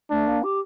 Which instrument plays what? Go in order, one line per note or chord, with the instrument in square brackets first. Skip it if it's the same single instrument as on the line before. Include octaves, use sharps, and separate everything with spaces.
[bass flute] A3 [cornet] D4
[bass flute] A#3
G4